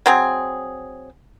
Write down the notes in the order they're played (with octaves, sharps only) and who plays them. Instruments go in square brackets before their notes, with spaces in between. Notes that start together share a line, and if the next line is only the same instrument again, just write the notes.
[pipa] F#3 C4 G#4